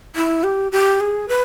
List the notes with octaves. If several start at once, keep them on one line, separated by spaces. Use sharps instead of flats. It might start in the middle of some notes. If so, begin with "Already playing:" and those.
E4
G4
G4
G#4
B4